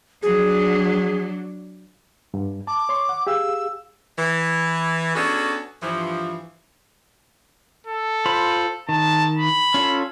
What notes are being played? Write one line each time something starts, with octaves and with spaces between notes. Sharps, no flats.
F#3 D4 G#4
G2
A5 D6
C#5 C6 C#6
F#5
G4 G#4 F5 E6
E3
B3 C#4 D4 F#4 G#4 A4
G2 E3 F3
A4
F4 C5 B5
D#3 A5
B5
C#4 F4 A4